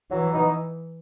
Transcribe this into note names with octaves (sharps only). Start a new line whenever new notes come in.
E3 F#3
B3 D#4